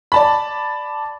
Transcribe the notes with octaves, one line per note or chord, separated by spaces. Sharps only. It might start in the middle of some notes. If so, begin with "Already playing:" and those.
D5 A5 B5